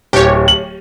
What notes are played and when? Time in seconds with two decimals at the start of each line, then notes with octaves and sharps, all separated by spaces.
0.13 D1 G4 C#5
0.48 F#7